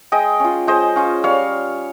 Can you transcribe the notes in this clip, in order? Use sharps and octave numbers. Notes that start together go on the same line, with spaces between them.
G#3 D#5 G5
C#4 F4
G#3 C5 D#5
C#4 F4
G3 C#5 F5